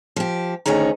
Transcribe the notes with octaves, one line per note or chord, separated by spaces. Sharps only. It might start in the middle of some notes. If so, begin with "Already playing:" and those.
F3 G4
D2 D#3 C#4 G#4 A#5